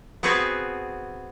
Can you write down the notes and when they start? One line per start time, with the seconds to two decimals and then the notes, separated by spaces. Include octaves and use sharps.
0.23 B3 C4 F#4 G#4 B4